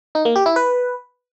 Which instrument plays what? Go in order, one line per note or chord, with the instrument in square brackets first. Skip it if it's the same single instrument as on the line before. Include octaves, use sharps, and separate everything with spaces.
[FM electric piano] D#4
A#3
G4
E4
B4